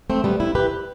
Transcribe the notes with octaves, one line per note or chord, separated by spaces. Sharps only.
A3 C4
G3 B3
C4 E4
G4 B4